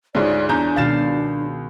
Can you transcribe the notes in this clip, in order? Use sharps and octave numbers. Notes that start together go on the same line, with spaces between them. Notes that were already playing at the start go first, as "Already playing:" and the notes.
D2 G#2 F4 G#4 C#5 D5
E2 D4 A#5 G6
C#2 B2 D#3 F5 A6 E7